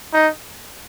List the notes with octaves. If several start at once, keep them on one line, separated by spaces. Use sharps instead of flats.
D#4